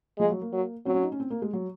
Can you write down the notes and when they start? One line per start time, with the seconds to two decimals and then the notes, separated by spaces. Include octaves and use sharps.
0.19 F3 G#3
0.31 F#3
0.41 A#3
0.53 F#3
0.86 F#3 C4
0.94 C#4
1.03 D#4
1.12 C#4
1.20 C4
1.30 A#3
1.42 G#3
1.53 F#3